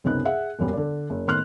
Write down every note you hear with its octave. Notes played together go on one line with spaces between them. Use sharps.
C#2 F#2 C3 B3 D#4 F#6
G#4 E5 F#5
E1 A#1 F#2 G3 B3
D3 D5
F#1
A2 D#3 B3 C6 F6 F#6